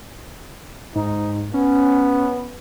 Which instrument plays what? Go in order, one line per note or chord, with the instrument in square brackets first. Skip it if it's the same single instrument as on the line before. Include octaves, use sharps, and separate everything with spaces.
[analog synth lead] G#2 [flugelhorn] D#4
[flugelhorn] B3 [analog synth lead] C#4